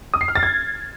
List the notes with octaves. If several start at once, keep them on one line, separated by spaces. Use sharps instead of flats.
D#6
C7
F6
A6
G#6